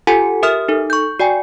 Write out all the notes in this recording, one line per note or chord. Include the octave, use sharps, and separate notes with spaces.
F4 G4 A4 F#5 G#5
G4 A#4 E5 D#6 F6
D#4 A4
C#6 G6
F#4 D5 G5 G#5